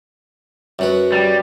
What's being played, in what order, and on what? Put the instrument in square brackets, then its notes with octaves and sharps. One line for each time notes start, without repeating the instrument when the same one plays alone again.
[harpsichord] F#2 F#3 B4
[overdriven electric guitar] G3